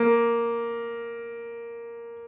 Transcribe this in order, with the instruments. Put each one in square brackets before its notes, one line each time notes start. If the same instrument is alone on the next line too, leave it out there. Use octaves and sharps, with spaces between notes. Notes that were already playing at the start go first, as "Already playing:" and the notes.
Already playing: [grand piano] A#3